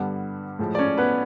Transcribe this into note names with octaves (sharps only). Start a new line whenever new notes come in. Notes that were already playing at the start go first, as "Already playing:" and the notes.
Already playing: G2 D3 G3 B3
A2 F3 G#3
D5
C#4 C#5
B3 B4